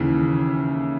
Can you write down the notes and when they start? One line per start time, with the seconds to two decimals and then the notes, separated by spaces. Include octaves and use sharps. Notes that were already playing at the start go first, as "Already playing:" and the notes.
Already playing: D#2 C#3 E3 E4